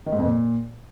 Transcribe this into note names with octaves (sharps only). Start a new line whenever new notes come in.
D#3
G#2
F2
A#2